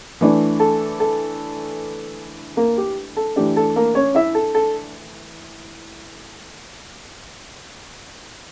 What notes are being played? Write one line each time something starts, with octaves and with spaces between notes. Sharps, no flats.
E3 A3 D4
A4
A4
A#3 A#4
G4
A4
E3 A3 D4 G4
A4
A#3 A#4
C#4 C#5
E4 E5
A4
A4